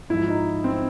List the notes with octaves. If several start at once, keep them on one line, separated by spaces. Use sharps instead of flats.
G#2 F3 E4
D#4
C4